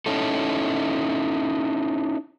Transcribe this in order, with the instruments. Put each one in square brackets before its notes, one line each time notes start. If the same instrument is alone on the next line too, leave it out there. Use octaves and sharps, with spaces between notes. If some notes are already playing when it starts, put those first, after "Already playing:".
[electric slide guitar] C#4 D#4 E4 A4